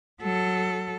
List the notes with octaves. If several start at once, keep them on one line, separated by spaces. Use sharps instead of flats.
F#3 A4